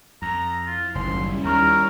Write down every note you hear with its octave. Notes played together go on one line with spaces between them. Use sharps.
F2 A#5
E4 F4 C5
F#1 D#2 G3 C#4 E4 C6
D#2 A#4 A#5 C#6 F6